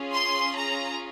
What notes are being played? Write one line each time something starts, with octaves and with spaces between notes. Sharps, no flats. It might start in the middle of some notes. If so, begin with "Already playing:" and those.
Already playing: C#4 F4 G#4
C6
A#5